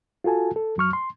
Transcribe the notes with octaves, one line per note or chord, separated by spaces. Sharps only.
F4 F#4 A4 G#5 A5
A4
F2 F#3 C#6 F6
C6